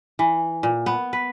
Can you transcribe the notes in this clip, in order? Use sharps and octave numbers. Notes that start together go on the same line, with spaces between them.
E3
A#2
B3
B4